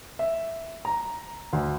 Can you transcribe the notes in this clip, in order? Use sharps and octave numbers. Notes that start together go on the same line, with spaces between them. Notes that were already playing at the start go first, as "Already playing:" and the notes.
E5
A#5
D2